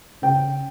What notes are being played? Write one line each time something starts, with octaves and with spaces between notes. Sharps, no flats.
C#3 G5